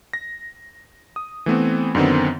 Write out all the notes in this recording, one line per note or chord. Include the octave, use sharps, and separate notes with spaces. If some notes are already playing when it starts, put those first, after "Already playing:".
A#6
D#6
E3 A3 B3 C4
F#2 D3 D#3 B3 C4